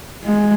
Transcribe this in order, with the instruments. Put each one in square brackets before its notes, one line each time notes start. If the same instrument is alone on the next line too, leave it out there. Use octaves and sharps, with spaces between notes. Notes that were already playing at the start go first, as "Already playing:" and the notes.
[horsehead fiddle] G#3